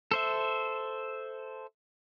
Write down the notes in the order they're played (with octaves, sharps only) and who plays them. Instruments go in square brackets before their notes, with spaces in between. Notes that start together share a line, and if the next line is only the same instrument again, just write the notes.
[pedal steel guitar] A4 C5 E5